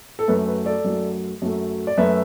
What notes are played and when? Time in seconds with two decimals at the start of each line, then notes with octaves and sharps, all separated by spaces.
0.19 A4
0.28 F#2 F#3 A3 B4
0.48 B4
0.66 A4 D5
0.84 F#2 F#3 A3
1.42 F#2 F#3 A3
1.87 D5
1.97 F#2 F#3 A3 B4 E5